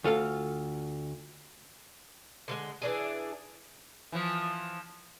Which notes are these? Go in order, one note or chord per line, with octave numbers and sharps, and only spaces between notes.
D2 F4 A4 F5
D3 F3 G#3
E3 D4 G#4
E3 F3